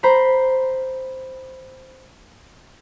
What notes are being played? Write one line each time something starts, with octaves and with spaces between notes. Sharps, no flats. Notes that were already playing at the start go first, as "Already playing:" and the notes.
C5 A#5 B5